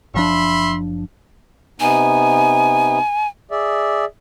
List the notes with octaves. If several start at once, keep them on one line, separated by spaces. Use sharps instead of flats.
F#1 F3 D4 E5 B5 C6
C3 B3 D#4 G#5
G#4 D5 E5